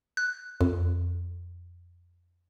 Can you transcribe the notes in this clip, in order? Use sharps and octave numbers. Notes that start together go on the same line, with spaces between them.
F#6
F2